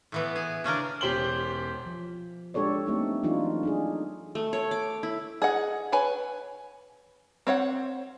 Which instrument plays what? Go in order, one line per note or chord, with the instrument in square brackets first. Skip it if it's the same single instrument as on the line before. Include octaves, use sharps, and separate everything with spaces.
[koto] A2 E3 B3
G#4
C#3 C#4 D4 A#4
[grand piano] E1 C#4 G4 C5 F#7 G7
[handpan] F3
G#3 D4 G4 A4 C#5 D5
A3 A#3 C4 D#4 G4
E3 F#3 D4 D#4 F4
D4 D#4 G#4
[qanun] A3
C#5
D6
E4
[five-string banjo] G#4 D#5 F#5
B4 C#5 G#5
C4 C#5 F5 F#5